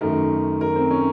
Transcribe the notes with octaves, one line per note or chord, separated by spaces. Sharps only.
F#2 D#3 A3 A#4
A#4
C4
C#4